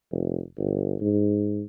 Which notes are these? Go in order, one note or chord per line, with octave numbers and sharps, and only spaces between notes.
F1
G1
G#2